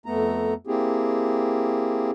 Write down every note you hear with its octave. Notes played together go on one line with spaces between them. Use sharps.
F2 A3 B3 A#5
A#3 C4 E4 G4 G#4